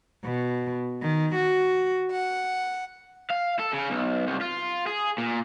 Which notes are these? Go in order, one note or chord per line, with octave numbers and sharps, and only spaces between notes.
B2
D#3
F#4
F#5
F5
A4
C#3
B1
C2
F4
G#4
A#2